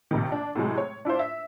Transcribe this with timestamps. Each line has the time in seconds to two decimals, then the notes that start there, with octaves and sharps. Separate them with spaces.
0.11 A#1 C3 D#3
0.32 D4
0.55 A2 C3 F#3 G#3
0.78 C#5
1.05 D4 E4 F4 C5
1.19 E5